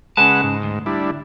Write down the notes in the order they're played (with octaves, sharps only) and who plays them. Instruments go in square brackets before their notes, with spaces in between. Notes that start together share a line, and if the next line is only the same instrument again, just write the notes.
[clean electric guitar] C#3 G#5 A5 [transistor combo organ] G#3 B4 F#5
[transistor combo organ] G#2
[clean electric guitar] D2
[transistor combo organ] G3 D4 E4